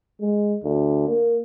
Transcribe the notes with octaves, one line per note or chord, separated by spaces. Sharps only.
G#3
D2
A#3